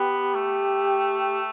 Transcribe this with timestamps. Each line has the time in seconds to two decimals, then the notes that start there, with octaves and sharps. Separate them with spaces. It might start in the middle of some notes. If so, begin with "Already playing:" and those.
Already playing: B3 G4
0.34 A3